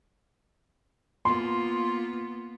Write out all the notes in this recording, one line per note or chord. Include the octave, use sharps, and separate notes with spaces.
A#3 B3 F4 C6